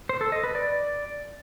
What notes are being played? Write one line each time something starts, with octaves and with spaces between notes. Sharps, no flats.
C5
A4
D#5
B4
D5